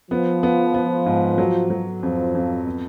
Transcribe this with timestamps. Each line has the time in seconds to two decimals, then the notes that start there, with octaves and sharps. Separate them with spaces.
0.11 F3 B3
0.43 B3
0.74 B3
1.06 G#2
1.38 F#3
1.70 F#3
2.03 F2 F3
2.35 F2
2.67 B3